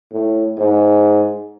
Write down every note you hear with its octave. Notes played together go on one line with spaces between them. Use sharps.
A2
G#2